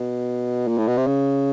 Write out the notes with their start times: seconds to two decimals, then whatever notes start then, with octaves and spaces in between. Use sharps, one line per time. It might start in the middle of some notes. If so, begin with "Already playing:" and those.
Already playing: B2
0.68 A#2
0.78 A2
0.88 B2
0.97 C3
1.07 C#3